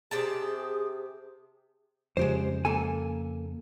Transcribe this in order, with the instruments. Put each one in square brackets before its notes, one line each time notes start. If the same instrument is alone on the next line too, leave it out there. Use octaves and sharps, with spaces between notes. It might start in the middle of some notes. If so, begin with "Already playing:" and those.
[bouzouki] C3 G5 A5 [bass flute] G#4
[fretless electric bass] F2 C#3 F3 [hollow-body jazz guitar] G#3 G4 C5
[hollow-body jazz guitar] A#3 A4 G#5